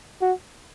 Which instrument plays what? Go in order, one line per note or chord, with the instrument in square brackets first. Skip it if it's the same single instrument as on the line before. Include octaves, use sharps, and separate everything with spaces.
[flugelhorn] F#4